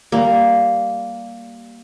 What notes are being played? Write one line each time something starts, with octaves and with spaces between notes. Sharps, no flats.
G3 A#3